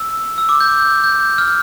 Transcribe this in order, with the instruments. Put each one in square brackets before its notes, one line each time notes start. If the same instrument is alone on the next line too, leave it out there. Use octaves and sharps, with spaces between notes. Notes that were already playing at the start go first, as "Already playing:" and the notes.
Already playing: [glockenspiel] E6
E6
D6
G6
G6
F6